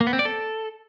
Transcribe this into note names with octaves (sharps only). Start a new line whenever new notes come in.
A#3
B3
C4
D5
A4